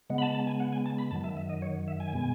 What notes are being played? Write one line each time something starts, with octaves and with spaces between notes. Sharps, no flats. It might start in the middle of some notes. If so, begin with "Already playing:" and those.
C#3 G#3 B3
B5
A5
A5
G#5
F#5
G#5
A5
B5
F#2 D#3 F#3 A5
E5
E5
D#5
C#5
E5
G#5
B2 G#3 B3